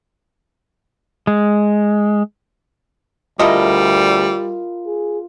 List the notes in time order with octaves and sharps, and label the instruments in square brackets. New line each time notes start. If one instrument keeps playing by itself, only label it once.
[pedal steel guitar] G#3
[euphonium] D2 [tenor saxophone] G3 [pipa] E4 A4 D#5 [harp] F4 A#4
[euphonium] G#4